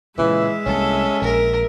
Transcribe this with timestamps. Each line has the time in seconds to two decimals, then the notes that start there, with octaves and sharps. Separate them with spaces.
0.18 A#2 C#3 E3 G#3 E5
0.66 C2 E3 A#3 C#4 A4
1.22 A#1 A#4